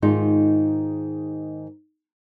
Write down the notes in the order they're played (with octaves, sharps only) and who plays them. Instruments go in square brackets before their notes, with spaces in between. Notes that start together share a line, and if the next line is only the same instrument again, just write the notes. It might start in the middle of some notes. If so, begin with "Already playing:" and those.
[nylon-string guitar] G#2 D#3 G#3 D#4 F4